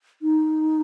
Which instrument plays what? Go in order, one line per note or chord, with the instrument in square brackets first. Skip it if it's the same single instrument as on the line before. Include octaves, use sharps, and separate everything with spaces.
[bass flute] D#4